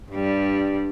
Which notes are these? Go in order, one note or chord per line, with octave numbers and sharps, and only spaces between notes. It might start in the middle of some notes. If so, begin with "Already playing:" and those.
G2 G3